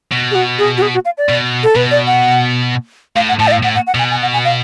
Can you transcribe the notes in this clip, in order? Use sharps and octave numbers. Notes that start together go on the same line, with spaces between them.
B2
G#4
F#4
G#4
F#4
G#4
F#4
F5
D5
B2
A4
B2 B4
D5
F#5
A2 F5
F#5
A2 A5
D5
F5
A2 F#5
F#5
F#5
B2 G#5
G#5
F#5
G#5
F5